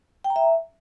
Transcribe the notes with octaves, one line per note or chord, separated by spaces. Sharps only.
G5
A#5
E5